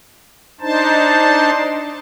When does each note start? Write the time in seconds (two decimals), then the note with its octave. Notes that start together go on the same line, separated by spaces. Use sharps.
0.61 D4 D#4 C5 A5